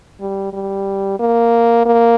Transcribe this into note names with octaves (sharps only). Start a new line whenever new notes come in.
G3
G3
A#3
A#3